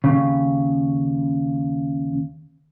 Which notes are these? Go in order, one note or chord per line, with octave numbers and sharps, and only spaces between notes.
D#2 C#3